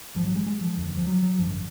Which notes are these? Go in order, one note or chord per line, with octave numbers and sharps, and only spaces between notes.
A#1 G#2 F3
F#3
G#3
G#3
F3
F1 D#2 D3
F3
F#3
F#3
G#1 F#2 D3 F3